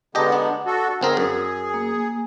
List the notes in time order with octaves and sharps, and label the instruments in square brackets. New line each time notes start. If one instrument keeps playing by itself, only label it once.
[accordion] D3 G#3 B3 [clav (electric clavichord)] G4 D#5 [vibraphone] A5 A#5
[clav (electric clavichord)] D4 [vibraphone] F#5
[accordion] F#4 A4
[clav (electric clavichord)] G1 C4 A#4 [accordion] G#4
[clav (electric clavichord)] F#2
[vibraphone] A#3 G#5